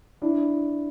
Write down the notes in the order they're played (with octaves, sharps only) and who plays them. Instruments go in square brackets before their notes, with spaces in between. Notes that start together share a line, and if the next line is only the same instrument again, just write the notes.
[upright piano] D4 E4